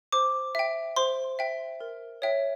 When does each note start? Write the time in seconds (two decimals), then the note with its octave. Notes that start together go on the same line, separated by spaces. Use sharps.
0.12 C5 D6
0.55 E5 G5
0.96 C5 C6
1.39 E5 G5
1.81 A#4
2.22 C#5 E5 G5